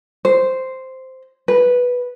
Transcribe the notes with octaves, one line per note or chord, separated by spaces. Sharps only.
C5
B4